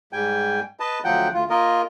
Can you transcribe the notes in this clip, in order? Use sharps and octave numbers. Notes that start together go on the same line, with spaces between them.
G#2 G3 G5 G#5
B4 D#5 A5
D2 F3 F#3 F#5 G5
D2 F4
A#3 F4 A#4 D#5